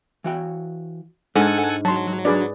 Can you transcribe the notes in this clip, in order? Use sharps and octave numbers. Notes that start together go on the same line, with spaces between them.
E3 F#4 G5
G#2 D4 A4 F#5 G#5
F#3 A5 C6
D4 F#4 G#4 B4 D5